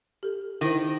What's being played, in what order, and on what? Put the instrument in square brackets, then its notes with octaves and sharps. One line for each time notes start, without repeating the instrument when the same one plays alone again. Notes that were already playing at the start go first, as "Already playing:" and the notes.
[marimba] G4 A4
[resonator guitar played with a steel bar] D#3 [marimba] E4 C5